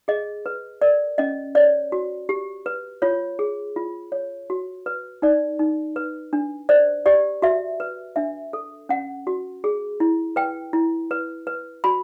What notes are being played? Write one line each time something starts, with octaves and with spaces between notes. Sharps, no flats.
G#4 D#5
B4
A#4 D5
C#4 D#5
C#5 D5
F#4
G4
B4
F4 C#5
G#4
F4
C#5
F#4
B4
D#4 D5
D#4
B4
D4
C5 D5
G4 D5
F#4 E5
B4
D4 E5
A4
C#4 F#5
F#4
G#4
E4
B4 G5
E4
B4
B4
F#4 B5